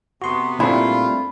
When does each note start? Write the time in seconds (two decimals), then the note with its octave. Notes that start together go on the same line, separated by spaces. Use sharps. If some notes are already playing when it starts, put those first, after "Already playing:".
0.22 C3 A3 B3 F#4 C6
0.60 A#2 G3 A3 C4 D4 E4 F4 B5